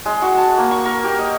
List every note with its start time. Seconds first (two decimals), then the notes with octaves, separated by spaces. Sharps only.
0.06 G#3
0.22 F#4
0.37 A5
0.58 A#3
0.71 C#6
0.85 A#4
1.04 G4
1.19 D#5